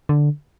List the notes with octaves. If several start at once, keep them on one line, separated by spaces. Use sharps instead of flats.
D3